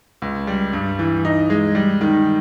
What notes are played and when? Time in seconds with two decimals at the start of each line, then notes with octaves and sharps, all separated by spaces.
0.22 C#2
0.47 G3
0.73 G2
0.99 E3
1.25 D#4
1.50 G#3
1.75 G3
2.01 D#3